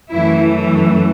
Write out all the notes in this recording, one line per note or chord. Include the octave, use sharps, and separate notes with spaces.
F#2 E3 A3 E4